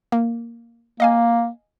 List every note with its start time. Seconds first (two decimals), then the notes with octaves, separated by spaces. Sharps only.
0.12 A#3
1.00 A#3 D#5 F5 G#5